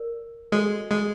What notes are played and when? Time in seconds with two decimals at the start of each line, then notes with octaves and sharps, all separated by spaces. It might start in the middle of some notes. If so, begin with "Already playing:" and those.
Already playing: A#4 D5
0.52 G#3 F#4 A4 C#5
0.91 G#3